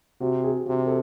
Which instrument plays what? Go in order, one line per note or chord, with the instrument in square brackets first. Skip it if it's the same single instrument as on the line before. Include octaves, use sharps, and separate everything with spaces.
[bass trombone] C3 [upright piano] F#4
[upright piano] G#4
[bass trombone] C3 [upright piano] F#4
[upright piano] A4